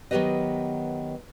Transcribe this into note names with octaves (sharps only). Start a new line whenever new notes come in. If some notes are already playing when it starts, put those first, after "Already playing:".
D#3 F#3 B3 G4 B4 D#5